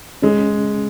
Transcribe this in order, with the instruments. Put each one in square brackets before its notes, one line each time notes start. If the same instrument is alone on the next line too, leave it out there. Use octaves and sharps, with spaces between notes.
[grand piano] G#3 [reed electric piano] C#4